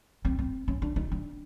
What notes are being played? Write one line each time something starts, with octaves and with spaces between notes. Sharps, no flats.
C4
C4
C#4
D4
D#4
D4